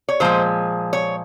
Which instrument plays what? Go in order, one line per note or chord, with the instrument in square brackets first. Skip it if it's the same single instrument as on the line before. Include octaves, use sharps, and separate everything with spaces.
[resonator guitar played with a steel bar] C#5
A#2 F3 G#3 C5
C#5